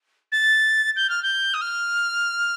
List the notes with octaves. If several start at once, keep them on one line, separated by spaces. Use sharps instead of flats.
A6
G6
F6
G6
D#6
F6